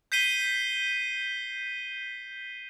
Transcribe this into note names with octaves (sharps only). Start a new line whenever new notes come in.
G6 B6 C7 D#7 G7